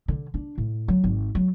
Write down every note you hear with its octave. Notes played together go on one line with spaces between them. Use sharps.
D3
D4
A2
F#3
G#1
F#3